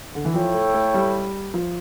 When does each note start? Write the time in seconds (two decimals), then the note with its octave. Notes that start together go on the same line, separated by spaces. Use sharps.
0.15 D3
0.25 E3
0.34 F3 E4 A4 C#5 G5
0.54 A3
0.74 A3
0.94 G3
1.54 F3